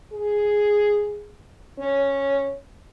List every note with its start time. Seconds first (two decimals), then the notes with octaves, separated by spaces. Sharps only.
0.13 G#4
1.78 C#4